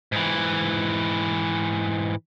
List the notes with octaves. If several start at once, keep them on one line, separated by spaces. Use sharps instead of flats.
G#2 E3